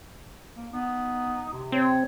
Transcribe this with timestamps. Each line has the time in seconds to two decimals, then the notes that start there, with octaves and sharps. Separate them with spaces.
0.57 A#3
0.73 B3 D#4
1.53 C3
1.72 C4 C#5